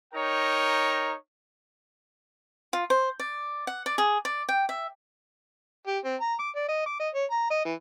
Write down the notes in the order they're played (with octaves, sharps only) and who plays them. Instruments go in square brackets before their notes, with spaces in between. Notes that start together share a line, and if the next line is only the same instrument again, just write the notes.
[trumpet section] D#4 A#4 C#5 G5 A#5
[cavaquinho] F4
C5
D5
F#5
D5
G#4
D5
G5
E5
[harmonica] G4
C4
A#5
D6
D5
D#5
D6
D#5
C#5
A#5
D#5
E3